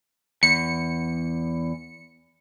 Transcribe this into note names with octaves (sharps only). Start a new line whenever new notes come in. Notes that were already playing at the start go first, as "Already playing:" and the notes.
E2 C#7